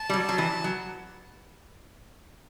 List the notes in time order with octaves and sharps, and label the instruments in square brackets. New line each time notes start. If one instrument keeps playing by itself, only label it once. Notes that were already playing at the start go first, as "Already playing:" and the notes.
Already playing: [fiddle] A5
[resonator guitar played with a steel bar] G3
F#3
F#3
E3
F#3